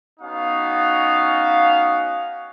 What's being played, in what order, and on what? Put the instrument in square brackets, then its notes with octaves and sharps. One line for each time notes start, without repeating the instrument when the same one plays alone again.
[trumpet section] B3 C#4 D#4 F#4 F5